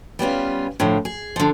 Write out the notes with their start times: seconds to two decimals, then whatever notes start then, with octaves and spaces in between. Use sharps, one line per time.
0.19 G3 B3 C#4 F4
0.80 A2 D3 F3
1.05 G#4
1.36 D3 F3